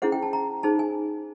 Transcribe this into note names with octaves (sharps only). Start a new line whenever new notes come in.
C#4 E4 G#4 C5 F#5
G5
A5
A#5
D#4 G#4 C5 A5
G#5